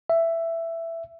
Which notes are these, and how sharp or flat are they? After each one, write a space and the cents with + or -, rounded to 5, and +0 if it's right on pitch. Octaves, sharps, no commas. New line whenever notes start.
E5 +10